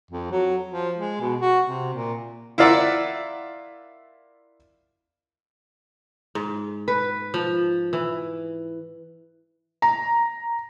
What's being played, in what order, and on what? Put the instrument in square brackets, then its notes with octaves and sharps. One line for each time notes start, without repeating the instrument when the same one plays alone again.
[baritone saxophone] F2
F#3
F3
G#3
B2
F#4
C3
A#2
[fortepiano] E4 F4 A#4 D5 E5 F#5
[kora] G#2
B4
F3
E3
[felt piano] A#5